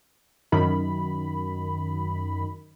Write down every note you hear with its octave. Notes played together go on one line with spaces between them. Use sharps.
F#2 D#3 B5